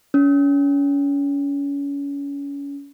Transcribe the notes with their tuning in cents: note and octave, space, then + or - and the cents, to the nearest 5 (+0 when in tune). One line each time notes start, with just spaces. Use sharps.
C#4 +30